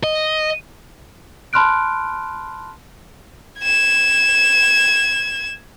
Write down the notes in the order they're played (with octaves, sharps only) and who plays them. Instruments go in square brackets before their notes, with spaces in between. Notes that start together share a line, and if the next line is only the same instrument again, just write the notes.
[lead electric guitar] D#5
[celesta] A5 B5 C6 F6 F#6 D7
[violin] G#6 E7